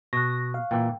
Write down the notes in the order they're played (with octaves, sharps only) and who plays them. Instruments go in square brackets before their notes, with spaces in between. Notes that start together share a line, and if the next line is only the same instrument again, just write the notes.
[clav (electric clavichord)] B2 [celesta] C#6 F#6 [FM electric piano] A#6
[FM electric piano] F5
[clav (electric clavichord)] A#2 E3 [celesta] G5